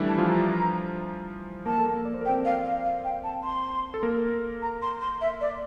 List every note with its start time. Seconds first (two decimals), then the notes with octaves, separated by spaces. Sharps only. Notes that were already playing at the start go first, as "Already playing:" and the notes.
Already playing: E3 G3 A3 D4 E4 A4
0.08 A5
0.18 F3 F4
0.29 A#5
1.66 A#3 A#4 A5
1.78 A4
1.86 A#3 A#4
2.05 D5
2.14 C5
2.21 A#4
2.25 G5
2.28 C4 C5
2.45 F5
2.64 F5
2.85 F5
3.04 G5
3.23 A5
3.44 C6
3.94 A4
4.03 A#3 A#4
4.62 A#5
4.82 C6
5.01 C6
5.21 E5
5.41 D5